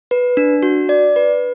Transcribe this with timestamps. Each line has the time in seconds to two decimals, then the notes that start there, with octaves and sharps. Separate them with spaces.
0.11 B4
0.37 D4
0.63 F#4
0.89 D5
1.16 B4